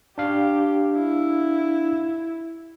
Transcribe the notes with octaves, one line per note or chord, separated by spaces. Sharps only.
D4 G4 F5
E4